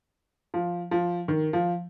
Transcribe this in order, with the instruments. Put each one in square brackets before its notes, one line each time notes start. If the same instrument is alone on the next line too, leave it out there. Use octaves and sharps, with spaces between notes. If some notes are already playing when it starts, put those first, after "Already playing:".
[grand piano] F3
F3
D#3
F3